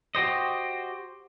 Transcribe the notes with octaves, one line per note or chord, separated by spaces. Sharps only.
F#4 G4 C5 D#5